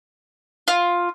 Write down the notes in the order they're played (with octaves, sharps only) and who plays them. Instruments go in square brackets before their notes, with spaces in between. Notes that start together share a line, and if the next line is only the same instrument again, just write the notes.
[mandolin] F4